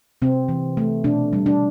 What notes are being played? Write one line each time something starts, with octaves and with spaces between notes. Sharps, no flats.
C3 C4
E3
A3
B2 D4
G3
D4